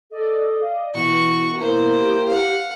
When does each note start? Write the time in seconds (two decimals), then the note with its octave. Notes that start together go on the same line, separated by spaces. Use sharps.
0.11 A4 D5 D#5
0.61 F5
0.94 B2 E3 B3 E4 F#4 C#6
1.57 A#3 E4 C5
1.97 G4 G5
2.29 F5 F#5